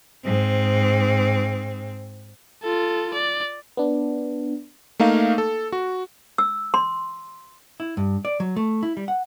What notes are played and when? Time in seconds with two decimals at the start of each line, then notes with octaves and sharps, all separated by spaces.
0.25 G#2 C4
2.63 F4 A4
3.14 D5
3.77 B3 D4
5.00 A3 A#3 D#4 F5
5.38 A4
5.72 F#4
6.38 E6
6.74 C6
7.80 E4
7.97 G2
8.25 D5
8.40 F#3
8.56 A3
8.83 E4
8.97 G3
9.08 F#5